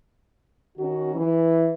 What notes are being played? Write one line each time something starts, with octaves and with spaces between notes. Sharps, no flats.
D#3 C#4 F#4
E3